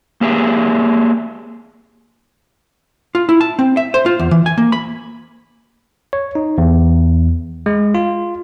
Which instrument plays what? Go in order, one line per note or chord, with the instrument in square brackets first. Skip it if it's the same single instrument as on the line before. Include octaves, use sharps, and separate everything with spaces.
[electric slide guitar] A#3 G4 G#4 E5
[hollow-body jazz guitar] F4
E4
A5
C4
E5
C5
F4
E2
E3
G#5
A#3
B5
[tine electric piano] C#5
D#4
E2
G#3
F4